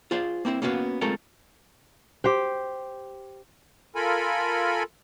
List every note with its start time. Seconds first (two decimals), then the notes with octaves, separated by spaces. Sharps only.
0.11 F4 G#4 C5 D5 F5
0.45 A#3 C4 E4 C5
0.62 A#3 B3 C#4 F#4 F5
1.01 G#3 A3 C4 F4 A4 A#4
2.24 G4 C5 G5
3.95 F4 A4 A#4 G#5 B5